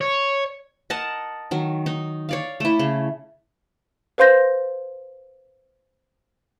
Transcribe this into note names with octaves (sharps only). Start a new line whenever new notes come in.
C#5
A#4 D#5 F#5 A5
D#3 F#3
D#4
C#5 D5 F5
A3 E4
C#3
B4 C5 F5 C6 G6 A#6